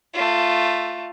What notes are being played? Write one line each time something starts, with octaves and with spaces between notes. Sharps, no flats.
A3 F4